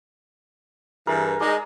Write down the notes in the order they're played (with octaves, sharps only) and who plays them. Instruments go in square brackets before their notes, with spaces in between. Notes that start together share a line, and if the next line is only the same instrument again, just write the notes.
[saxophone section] G2 E3 [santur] G#4 A#4
[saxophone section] G#3 D#4 [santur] G#4 D5